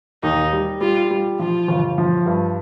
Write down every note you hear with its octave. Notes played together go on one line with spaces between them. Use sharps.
D#2 D#4
G3
G3 F4
G3
F3 F4
G1
F3
G2